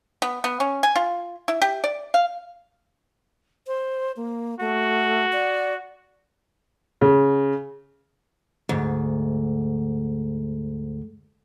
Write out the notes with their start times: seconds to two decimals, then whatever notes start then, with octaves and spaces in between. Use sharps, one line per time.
0.22 B3
0.44 B3
0.60 C#4
0.83 G#5
0.95 F4
1.48 E4
1.62 G4
1.84 D5
2.14 F5
3.67 C5
4.16 A#3
4.60 A3 F#4
5.33 D5
7.01 C#3
8.69 D2 G#2